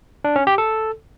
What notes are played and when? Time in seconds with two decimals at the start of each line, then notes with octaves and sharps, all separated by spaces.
0.24 D4
0.36 C#4
0.47 G4
0.58 A4